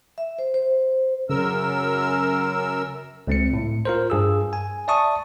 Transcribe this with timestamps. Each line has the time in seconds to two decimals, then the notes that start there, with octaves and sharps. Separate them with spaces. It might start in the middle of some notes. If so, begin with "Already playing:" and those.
0.18 E5
0.39 C5
0.54 C5
1.30 F#2 C#3 A#4 E6
3.27 C#2 C4 C#7
3.53 A2
3.85 F4 A#4 C5
4.10 G2 G#4 E6
4.53 G#5
4.88 D5 E5 A5 C#6 D#6